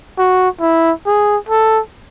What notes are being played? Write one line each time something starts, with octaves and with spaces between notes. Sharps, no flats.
F#4
E4
G#4
A4